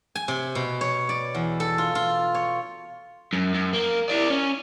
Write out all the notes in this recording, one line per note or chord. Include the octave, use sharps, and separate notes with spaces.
G#5
C3
B2
C#5
D5
E2
A4
F4
F4
C#5
F#2
F#2
A#3
E4 D5
C#4